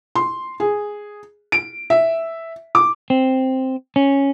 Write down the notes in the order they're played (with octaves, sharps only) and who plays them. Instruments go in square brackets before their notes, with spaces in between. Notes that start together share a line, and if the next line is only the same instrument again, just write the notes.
[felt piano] C6
G#4
D7
E5
D6
[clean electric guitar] C4
C#4